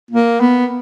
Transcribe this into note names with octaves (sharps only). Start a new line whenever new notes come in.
A#3
B3